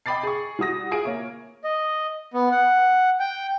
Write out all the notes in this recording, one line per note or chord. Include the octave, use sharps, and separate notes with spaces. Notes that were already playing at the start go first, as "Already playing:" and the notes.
D#5 G5 B5 D6 A6 C7
G#4 C#6
G3 F#4 D#6 A#6
F4 G#4 G#5 D#6 D7
A#3 C#5 E5
D#5
B3
F#5
G5